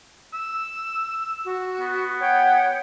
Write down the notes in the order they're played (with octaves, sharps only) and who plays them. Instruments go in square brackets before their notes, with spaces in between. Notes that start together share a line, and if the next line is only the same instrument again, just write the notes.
[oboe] E6
[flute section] F#4
[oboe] B3
[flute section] C#5 F#5 G5